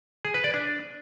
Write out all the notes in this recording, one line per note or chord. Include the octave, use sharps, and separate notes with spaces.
G#4
B4
D5
D4